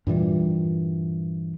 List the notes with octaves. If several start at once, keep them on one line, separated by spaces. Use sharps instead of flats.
G2 A#2 E3 G3